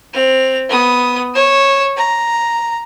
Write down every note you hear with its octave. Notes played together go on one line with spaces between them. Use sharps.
C4 F7
B3 D#6
C#5 E7
A#5